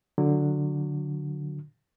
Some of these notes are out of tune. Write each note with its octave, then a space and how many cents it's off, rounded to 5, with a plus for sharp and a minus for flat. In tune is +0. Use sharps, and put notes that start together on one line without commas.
D3 +0 F#3 -15